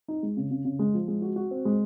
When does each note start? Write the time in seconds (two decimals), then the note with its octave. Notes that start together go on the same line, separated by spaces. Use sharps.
0.08 D#4
0.23 G#3
0.37 C#3
0.51 C#3
0.65 C#3
0.79 G#3
0.94 F3
1.08 G#3
1.22 F#4
1.36 F#4
1.51 C4
1.65 G#3